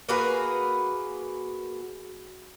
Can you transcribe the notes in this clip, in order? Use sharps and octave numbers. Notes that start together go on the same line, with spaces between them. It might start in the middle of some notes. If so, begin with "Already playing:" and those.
A#3 F#4 G#4 B4